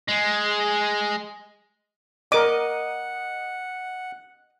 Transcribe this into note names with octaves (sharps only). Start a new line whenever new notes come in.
G#3
A#4 D#5 F#5 D6